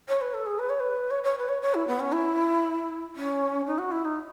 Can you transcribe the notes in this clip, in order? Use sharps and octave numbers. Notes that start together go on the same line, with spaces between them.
C#5
B4
A4
G#4
B4
C#5
B4
C#5
C#5
B4
C#5
C#5
E4
B3
C#4
E4
C#4
D#4
F#4
E4
D#4